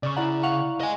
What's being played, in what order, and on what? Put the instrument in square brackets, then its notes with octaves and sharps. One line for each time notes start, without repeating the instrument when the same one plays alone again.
[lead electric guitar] C#3 [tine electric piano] D5 C#6
[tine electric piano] E4 D5 A#5 [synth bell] F#5
[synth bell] F5 F#5 C#6
[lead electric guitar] D#5 G#5